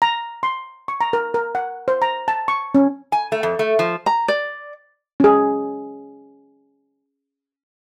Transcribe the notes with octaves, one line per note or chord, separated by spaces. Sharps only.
A#5
C6
C#6
A#5
A#4
A#4
F#5
C5
A#5
A5
C#6
C#4
G#5
A3
F2
A3
F3
A#5
D5
C#4 G#4